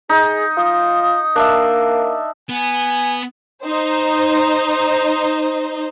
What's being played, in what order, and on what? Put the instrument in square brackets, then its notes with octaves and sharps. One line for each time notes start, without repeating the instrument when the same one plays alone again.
[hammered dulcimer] D#4 [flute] G#4
[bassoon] F4 [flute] D#6
[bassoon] A#3 [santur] D4 E5
[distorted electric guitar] B3 [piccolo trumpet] G#5
[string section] D#4 C5